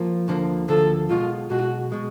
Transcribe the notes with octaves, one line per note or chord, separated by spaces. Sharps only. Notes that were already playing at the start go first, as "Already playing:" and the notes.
Already playing: F3 A#3
D2 D3 F3 A#3
D2 D3 F3 A#3 A4
B1 B2 G#3 F4
B1 B2 G#3 F#4
B2 G#3